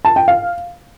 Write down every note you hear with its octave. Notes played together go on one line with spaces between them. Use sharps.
A5
G5
F5